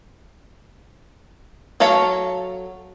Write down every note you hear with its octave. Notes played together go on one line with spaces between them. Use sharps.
F#3 A4 C#5 F5 A5